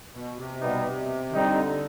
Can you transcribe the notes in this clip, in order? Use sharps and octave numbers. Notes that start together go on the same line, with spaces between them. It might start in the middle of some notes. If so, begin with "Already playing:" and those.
B2
C3
B2 G3 B3 D#4
D#3
D3 G3 C4 D#4